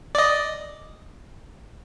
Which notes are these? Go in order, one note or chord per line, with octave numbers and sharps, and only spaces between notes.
D5 D#5